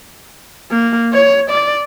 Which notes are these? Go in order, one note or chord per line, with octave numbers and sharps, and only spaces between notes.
A#3
C#5
D5